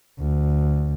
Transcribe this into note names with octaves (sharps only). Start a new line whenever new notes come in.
D2